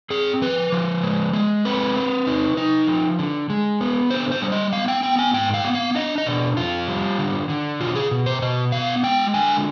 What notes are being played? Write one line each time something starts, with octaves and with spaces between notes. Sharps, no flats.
C4 G#4
F3 B4
F3
G#3
G#3
C4 B4
C4
D#4
D#4
F3
D3
G#3
B3
D3 C5
C5
G3
D#5
B3 F5
G5
B3 G5
G#5
G#2 G5
F5
B3
F5
D4 D#5
D#5
B2 D5
F2 F4
G3
D3
D3
B2 F4
G#4
B2
C5
B2 D#5
B3 F5
G#3 G5
D3 G#5